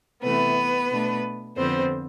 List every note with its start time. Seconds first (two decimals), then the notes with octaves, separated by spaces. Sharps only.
0.23 C3 E3 A3 B3 B4
0.91 B2 A3 D4
1.57 F2 D3 F3 B3 C4 C5